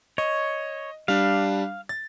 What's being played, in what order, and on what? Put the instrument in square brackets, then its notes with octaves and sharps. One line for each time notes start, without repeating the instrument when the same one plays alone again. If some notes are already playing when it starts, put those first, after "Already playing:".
[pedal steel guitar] C#5 [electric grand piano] D#5
[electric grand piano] G3 D4 [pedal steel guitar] F5
[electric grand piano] A6